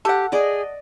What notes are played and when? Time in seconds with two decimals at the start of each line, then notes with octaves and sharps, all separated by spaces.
0.05 G4 A4 F#5
0.32 G#4 D5 D#5 D6